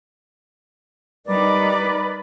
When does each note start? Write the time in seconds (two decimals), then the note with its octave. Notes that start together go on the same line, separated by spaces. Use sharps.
1.26 G3 D#4 A#4 B4 D5